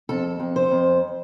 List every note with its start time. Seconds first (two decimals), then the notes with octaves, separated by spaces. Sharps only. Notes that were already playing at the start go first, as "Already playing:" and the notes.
0.09 F2 A4
0.40 F2
0.56 C5
0.71 F2